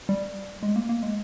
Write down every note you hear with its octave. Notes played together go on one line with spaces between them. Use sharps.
G3
G#3
A#3
A#3
G#3